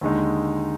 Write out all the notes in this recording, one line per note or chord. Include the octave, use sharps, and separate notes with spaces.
D#2 D3 G#3 D#4